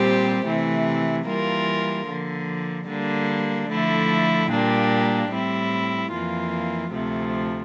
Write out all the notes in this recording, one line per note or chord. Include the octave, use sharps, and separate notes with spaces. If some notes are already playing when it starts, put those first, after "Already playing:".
Already playing: A#2 G3 C4 G4 C5
C3 E3 A3
E3 G3 A#3 F4 A#4
D3 F3 A#3
D3 G3 A#3 D4
D3 F3 A3 E4
A#2 G3 A#3 D4 G4
A2 G3 C4 E4
F2 E3 A#3 F4
D2 C3 F3 A3